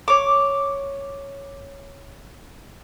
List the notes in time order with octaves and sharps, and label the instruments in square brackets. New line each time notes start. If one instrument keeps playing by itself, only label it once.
[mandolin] C#5 D6